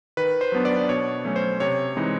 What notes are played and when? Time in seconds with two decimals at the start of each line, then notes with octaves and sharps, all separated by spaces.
0.17 D#3 B4
0.41 C5
0.52 F#3 B3 D4
0.65 D5
0.89 B2 C#5
1.25 F#3 A3 C#4
1.36 C5
1.60 C3 C#5
1.96 E3 G#3 C4 D#4